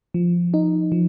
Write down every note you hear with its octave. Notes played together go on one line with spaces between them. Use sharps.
F3
D#4
F3